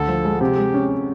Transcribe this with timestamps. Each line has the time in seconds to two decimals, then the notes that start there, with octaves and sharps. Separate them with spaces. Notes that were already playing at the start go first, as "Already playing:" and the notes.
Already playing: D2 A4
0.08 F3
0.25 G#3
0.41 C3 G4
0.57 G#3
0.74 C#4